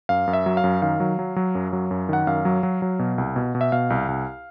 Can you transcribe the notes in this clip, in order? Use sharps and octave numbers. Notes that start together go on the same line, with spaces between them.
F#2 F5
F#2
E5
F#3
F5
F#2
D#3 F5
F#3
F#3
F#3
F#2
F#3
F#2
D#3 F#5
F#2 F5
F#3
F#3
F#3
B2
C2
B2
B2
E5
B2 F5
C2
C2